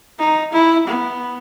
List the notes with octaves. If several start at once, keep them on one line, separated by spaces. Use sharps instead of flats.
D#4
E4
B3